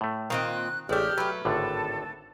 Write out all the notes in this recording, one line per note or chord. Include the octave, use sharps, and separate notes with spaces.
A2 A3
A#2 D#3 C4 D#5 F5 F#6
A1 G#3 A3 D4 G4 F6
F#3 A3 B4
G#1 A2 D3 A4